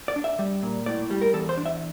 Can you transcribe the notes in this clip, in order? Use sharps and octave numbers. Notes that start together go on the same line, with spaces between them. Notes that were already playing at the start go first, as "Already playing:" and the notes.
D5
D4
E5
G3
A#2
A2 D5
G3
A#4
E2 A4
C5
D4
E5